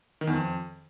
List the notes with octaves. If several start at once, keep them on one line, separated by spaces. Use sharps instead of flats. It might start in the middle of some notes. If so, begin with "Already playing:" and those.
D#3
E2
F2